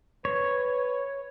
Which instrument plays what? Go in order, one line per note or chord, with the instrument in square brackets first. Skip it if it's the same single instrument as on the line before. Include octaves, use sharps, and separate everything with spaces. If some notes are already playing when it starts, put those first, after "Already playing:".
[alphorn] B4 [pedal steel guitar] C#5